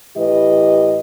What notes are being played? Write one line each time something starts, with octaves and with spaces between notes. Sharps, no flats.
A2 E3 G4 B4 D#5